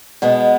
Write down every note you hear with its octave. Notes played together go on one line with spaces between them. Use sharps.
B2 G#3 B3